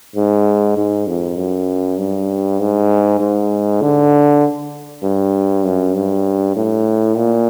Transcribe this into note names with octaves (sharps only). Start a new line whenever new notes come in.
G#2
G#2
F2
F#2
G2
G#2
G#2
D3
G2
F#2
G2
A2
A#2